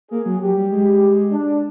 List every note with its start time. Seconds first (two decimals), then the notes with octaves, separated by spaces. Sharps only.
0.11 A#3 G#4
0.26 F#3
0.41 F#3 G4
0.56 G3
0.71 G#3
1.31 D4